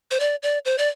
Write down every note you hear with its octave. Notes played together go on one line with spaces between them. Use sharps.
C5
D5
D5
C5
D5